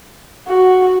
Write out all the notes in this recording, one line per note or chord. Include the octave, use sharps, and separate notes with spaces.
F#4